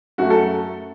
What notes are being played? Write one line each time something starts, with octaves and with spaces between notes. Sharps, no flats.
F#2 F#3 A3 F#4
A4